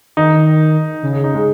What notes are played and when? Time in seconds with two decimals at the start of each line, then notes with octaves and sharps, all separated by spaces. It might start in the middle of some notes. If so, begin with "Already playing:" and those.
0.17 D#3 D#4
1.02 C#3
1.13 G#4
1.24 D#4
1.34 G#3